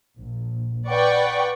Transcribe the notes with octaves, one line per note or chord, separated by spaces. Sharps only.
A#1
B4 D5 F#5 G5 C#6